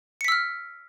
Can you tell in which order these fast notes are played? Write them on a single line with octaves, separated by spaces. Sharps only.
C#7 B6 E6 F6